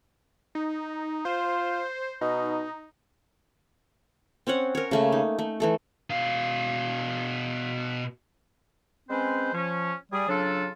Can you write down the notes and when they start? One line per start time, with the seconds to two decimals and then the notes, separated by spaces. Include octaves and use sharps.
0.55 D#4
1.25 F4 C5
2.21 B2 D#4
4.47 C4 C#4 C#5 F#5
4.75 A#4 C#5
4.91 C#3 A3 A#3
5.12 D#4
5.39 A3
5.60 E3 A3 A4
6.10 B2 F5
9.09 G#3 C4 C#4 B4 C5
9.54 F3 C#4
10.12 G3 G#4
10.29 C#3 F#3 D4 F4 A4